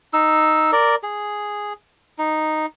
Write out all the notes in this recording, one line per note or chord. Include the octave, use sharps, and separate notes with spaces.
D#4 E6
A#4 D5
G#4
D#4